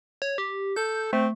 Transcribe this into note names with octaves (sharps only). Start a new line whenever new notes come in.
C#5
G4
A4 G6
A3 C4